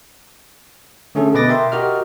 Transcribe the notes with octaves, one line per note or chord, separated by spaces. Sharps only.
D3 A3 C#4 G#4 A4
B2 B4 D#5 D6 A6 A#6
A#4 E5 G5 C6
F#4 G4 A#4 D#5 F6